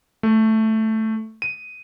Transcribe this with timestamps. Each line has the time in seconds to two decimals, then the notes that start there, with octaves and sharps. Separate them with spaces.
0.23 A3
1.42 D#7